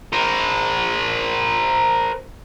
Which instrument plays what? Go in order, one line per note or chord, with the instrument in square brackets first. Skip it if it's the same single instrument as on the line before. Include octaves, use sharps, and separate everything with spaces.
[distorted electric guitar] A#4 C5